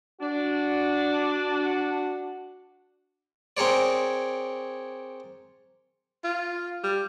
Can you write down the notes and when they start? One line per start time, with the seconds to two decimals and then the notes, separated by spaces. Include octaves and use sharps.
0.21 D4 F#4
3.57 C4 G#4 A#4 C#5 D5
6.24 F4
6.84 G3